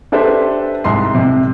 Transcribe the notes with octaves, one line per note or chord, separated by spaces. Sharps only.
D4 G4 A4 B4 C5 E5
C2 G#2 C6 C7
C3